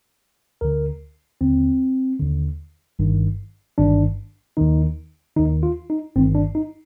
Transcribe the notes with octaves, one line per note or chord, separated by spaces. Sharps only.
D2 D3 A#4
D#2 D3 C4
D#2 D3
G1 G2 D#3
G1 G2 D#3 D4
D#2 D#3 D#4
D#2 D#3 D#4
F4
D#4
G1 G2 D#3 C4
D4
D#4